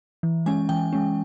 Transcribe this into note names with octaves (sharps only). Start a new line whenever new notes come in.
E3
G#3 C#4 G#5
E3 G5
G#3 C#4